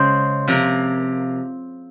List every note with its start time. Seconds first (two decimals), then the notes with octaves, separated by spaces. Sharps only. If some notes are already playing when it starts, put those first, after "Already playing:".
Already playing: C#3 G#3 C5
0.48 C3 F3 A#3